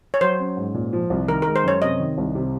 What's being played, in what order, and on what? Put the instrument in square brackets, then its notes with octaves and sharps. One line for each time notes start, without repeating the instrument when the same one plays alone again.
[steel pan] C#5
[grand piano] F#3 [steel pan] C5
[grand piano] C#4
G#2
A#2
F3
C2
[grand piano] D#3 [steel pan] A#4
[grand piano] G#3 [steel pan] A#4
[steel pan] C5
[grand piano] F#2 [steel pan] C#5
[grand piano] C3 [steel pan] D#5
[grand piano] D#3
C2
C3